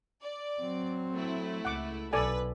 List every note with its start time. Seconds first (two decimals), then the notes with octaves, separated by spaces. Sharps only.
0.20 D5
0.60 F#3 C4
1.15 A3 E4
1.65 C#2 F#5 D6
2.13 B1 A4 B4 D5 G#5